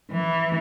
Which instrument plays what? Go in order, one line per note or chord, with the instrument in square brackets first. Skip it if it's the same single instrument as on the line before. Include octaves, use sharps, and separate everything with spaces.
[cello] E3